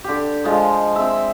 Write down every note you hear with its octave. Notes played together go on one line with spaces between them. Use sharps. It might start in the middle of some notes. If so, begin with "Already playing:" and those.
D3 G4
F3 G#3 D#5
C4 E5